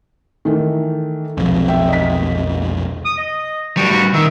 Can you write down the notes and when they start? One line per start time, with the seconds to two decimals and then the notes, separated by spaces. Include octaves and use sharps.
0.45 D#3 E3 A3
1.37 F1 B1 F2
1.68 E5 G5
1.89 D#5 B6
3.05 D#6
3.17 D#5
3.77 A2 G3 F#4
3.90 F#4
4.14 D#3 E5